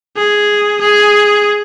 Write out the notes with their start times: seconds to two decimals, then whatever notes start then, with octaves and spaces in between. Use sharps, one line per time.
0.16 G#4
0.81 G#4